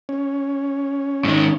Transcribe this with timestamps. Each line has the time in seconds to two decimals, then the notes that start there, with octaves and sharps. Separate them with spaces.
0.09 C#4
1.25 G#2 D#3